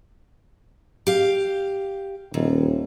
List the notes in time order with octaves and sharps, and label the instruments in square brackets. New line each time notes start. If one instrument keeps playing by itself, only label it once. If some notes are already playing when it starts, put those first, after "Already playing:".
[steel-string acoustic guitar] G4 F5
[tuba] D#1 [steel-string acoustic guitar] D#2